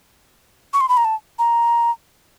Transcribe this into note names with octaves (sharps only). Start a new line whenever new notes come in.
C#6
C6
B5
A#5
A5
A#5